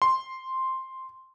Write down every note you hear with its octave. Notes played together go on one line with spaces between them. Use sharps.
C6